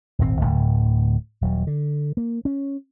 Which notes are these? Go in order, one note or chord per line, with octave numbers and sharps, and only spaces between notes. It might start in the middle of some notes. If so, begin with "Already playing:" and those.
D#1 G#1 A2 C4
D1 B1 A2 D3
D#1 F#3
D3
A#3
C#4